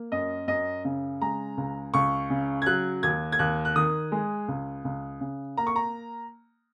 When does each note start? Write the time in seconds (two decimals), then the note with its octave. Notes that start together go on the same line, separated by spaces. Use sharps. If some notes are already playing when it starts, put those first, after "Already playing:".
Already playing: A#3
0.12 F#2 D#5
0.48 F#2 D#5
0.85 C#3
1.22 G#3 A#5
1.57 C#2
1.94 C#2 C#6
2.30 C#3
2.62 G#6
2.66 F#3 F#6
3.03 D#2 G#6
3.32 G#6
3.39 D#2 F#6
3.65 F#6
3.76 D#3 D#6
4.12 G#3
4.48 C#2
4.85 C#2
5.21 C#3
5.57 A#3 A#5
5.67 C#6
5.76 A#5